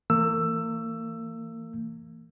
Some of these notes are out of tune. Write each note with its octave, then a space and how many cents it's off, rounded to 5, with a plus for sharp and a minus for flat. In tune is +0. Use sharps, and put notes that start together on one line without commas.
E3 +0 A#3 -40 E6 +15